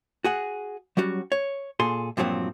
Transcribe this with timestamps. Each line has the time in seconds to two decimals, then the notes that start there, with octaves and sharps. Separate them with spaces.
0.24 F#4 G#4 F#5
0.97 F#3 G3 C#4 F#4
1.32 C#5
1.80 A#2 G#4 A4 C6
2.17 G2 A#2 F3 F#3 C4